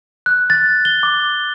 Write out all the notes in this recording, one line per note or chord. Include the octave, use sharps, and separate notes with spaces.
F#6
A6
G7
D6